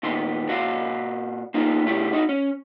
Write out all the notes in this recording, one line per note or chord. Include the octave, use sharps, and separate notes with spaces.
A#2 D#3 B3 C6
A#2 F#4 C#5 F5
A#3 B3 D#4 F4
C#3 A3 E4 G4
D#4 F#4
C#4